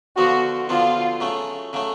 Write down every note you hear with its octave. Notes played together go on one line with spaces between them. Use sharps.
D3 F3 B3 F#4
D3 F3 B3 F4
C#3 F#3 A3
C#3 F#3 A3